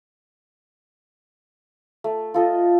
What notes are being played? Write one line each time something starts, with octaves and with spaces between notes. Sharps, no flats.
A3
F4 A4 D#5